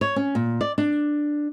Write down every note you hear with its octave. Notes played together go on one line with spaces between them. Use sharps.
C#5
C#4
A#2
D5
D4